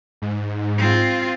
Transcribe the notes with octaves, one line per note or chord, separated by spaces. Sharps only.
G#2
C4 F4